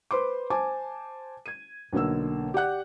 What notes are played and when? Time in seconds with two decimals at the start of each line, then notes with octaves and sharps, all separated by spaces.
0.11 B4 C5 C6 D6
0.50 C5 G#5 A5 D6
1.46 G#6 D#7
1.93 B1 D3 A#3 E6
2.54 G4 D5 F#5 F#6